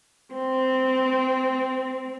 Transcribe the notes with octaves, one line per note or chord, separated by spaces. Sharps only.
C4